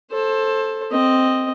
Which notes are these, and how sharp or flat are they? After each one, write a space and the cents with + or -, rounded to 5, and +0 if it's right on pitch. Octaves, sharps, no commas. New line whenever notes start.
A4 +0 C5 +25
C4 +0 D#5 +0